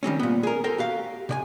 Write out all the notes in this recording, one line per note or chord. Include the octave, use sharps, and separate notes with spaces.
D#3 G3 C4 C#4
A#2 B3
G#4 A#4
A4 A#4 C5 G5
F#4 G4 F5
C3 D5 G#5